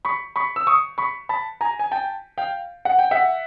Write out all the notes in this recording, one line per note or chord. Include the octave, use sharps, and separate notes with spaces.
B5 C#6
B5 C#6
E6
C#6 D#6
B5 C#6
A5 B5
G#5 A#5
G#5
G5 A5
F5 G5
F#5
G5
E5 F#5